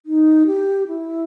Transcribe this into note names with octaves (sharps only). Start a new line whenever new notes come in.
D#4
G4
E4